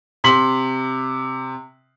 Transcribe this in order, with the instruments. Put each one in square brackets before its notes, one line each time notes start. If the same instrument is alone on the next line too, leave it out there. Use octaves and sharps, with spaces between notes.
[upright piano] C3 C6 B6 F#7